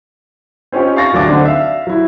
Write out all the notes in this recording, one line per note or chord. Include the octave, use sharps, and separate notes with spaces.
C4 C#4 D#4 F4 G4
F5 C#6 A6 A#6
D2 F#3 A#3 D4 D6
D3 C4 D4 D#4 F#4
E5 F5
F#3 E4